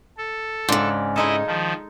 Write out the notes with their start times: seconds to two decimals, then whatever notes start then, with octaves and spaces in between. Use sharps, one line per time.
0.17 A4
0.69 G#2 C#3 D4
1.16 G#3 D#4 E4 A4 D#5
1.47 D#3 F3